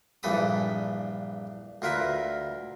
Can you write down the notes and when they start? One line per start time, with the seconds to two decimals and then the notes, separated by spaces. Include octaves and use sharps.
0.23 A#1 G2 E3 A4 B5 D#6
1.82 D2 F4 A#4 B4 E5